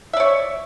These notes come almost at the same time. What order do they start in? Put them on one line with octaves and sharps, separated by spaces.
E5 D5 C#5